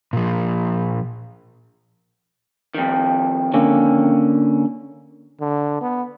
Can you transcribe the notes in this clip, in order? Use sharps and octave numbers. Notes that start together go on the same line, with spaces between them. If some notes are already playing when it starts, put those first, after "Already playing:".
A#2 F3
F2 D#3
D3 A#3 C#4
D3
B3